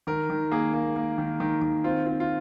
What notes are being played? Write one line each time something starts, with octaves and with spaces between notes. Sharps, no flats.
D#3 A#4
D#3
A#3 G#4
A#3
A#3
D#3
D#3
D#3
C4 F4
C4 F4
F4